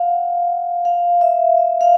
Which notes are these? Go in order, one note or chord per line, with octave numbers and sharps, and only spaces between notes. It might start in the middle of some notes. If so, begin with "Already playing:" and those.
Already playing: F5 F#5
F5
E5
E5
F5